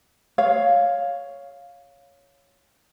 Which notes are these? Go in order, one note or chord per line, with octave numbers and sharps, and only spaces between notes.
C#5 F5